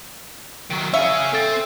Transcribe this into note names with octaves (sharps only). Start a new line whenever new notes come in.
D#3 F#3
C#4 G#4 E5 F5
C4 A4 A6